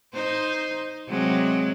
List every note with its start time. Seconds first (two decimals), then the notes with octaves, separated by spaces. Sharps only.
0.13 D#4 C5
1.08 C3 F#3 G#3